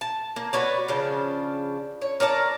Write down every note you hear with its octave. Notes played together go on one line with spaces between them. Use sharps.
A5
A#3
F#4 B4 C#5 D5
C#3 F3 D4
C#5
A#4 C#5 D5 A5